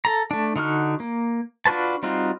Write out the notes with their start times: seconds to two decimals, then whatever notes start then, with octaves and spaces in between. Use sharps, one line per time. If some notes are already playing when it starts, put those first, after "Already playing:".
0.05 A4 A#5
0.31 A3 D4
0.56 D3 D#4 F#4 F6
1.00 A#3
1.66 D4 F4 F#4 B4 A5
2.03 G3 C4 D#4 F4 F#4